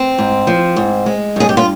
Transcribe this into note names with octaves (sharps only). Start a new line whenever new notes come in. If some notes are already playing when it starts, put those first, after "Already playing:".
Already playing: C4
G#2
F3
G#2
G#3
G2 G#4
G4
F4